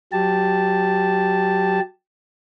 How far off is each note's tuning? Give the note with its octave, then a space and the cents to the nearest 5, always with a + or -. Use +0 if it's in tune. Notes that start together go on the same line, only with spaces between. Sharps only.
F#3 -5 G4 +0 A5 +0